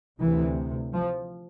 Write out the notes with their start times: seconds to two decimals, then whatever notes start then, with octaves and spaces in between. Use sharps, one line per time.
0.21 D2 C3 E3
0.93 F3